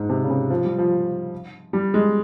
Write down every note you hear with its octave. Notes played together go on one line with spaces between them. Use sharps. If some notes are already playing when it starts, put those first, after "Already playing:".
Already playing: G#2
C3
C#3
C3
F3
G3
F3
G3
G#3